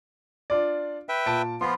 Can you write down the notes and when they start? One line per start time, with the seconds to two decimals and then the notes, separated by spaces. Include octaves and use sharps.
0.50 D4 F4 D5
1.09 B4 E5 G5
1.26 A#2 A5 D7
1.61 F3 B3 F4 B5 C6